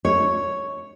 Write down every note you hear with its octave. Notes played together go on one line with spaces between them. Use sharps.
C#5